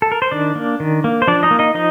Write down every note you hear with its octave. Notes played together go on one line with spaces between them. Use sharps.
A4
A#4
C5
D#3 D4 D5
A#3
D#3
A#3
C5
F3 D4 D5
D#4 D#5
A#3
D#4 D#5
F3 D#4 D#5